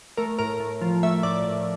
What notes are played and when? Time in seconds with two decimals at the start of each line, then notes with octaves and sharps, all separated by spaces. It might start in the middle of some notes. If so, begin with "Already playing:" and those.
0.17 A3 A#4
0.39 A2 A#4
0.60 A2
0.81 F3
1.03 A3 E5
1.23 A2 D5
1.45 A2